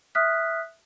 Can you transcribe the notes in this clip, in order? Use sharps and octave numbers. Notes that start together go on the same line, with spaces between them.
E5 D#6 F6 F#6 B6